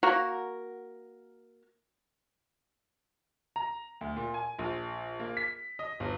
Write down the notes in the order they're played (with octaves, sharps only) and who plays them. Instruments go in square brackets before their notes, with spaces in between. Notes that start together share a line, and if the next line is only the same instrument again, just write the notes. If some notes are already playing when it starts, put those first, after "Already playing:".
[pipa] A#3 F#4 A#4
[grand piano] A#5
D2
A#2
G#5
A#1
A#3
B6
D#5
G1